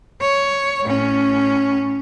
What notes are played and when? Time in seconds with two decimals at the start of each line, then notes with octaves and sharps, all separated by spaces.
0.21 C#5
0.84 A2 C#4